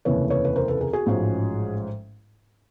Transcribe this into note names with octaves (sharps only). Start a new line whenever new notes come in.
F1 D#2 C#3 E3 B4 C#5
B4 C#5
B4
A#4 C5
A4 B4
G#4 A#4
F#4 G#4
A1 G#2 F3 G#3 C#4